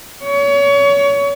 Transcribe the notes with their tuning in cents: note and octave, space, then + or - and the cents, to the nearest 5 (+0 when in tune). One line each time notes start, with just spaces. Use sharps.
C#5 +30